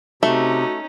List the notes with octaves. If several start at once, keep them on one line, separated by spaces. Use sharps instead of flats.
C3 A3 C#4 D#4 F#4 E5